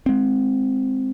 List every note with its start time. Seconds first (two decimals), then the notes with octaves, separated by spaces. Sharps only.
0.06 G#3 C4